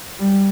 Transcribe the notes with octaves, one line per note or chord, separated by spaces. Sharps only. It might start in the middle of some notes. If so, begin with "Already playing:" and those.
G3